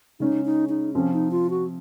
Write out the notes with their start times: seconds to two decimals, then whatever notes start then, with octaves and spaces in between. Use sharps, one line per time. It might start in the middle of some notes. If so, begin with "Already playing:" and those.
0.20 C#3 G#3 C#4 D#4
0.45 D#4
0.69 D#4
0.94 C3 F3 C4 C#4
1.13 D#4
1.31 F4
1.50 F#4